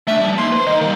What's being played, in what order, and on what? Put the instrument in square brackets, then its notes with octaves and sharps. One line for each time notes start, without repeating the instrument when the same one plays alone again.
[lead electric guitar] A3 D4 [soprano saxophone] E5
[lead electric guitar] F3 G3
[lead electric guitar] A#3 D#4 [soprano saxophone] C6
[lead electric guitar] B4 C5
[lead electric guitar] D#3 [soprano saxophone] D#5
[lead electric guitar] D#3 G3 [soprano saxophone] A#3